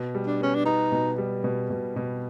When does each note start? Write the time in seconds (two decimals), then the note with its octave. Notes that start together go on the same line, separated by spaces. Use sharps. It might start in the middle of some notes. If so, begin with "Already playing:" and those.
Already playing: B2
0.15 G3
0.27 D4
0.41 B3 C#4
0.55 D4
0.66 B3 D#4
0.92 B2
1.18 G3
1.44 B2
1.70 B2
1.96 B2